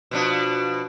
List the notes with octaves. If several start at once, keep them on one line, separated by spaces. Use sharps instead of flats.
B2 F3 D4